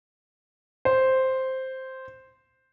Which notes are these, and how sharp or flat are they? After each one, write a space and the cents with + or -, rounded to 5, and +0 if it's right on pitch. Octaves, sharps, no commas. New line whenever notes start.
C5 +0